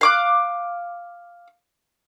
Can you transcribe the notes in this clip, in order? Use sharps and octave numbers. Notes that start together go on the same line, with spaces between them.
F5 D6 F#6